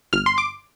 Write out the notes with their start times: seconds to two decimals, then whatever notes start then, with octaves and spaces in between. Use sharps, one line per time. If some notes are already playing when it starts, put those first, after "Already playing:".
0.13 G1 F6
0.26 C6
0.38 D6